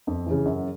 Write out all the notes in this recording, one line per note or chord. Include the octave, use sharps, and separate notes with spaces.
F2
C#3 E3
F#2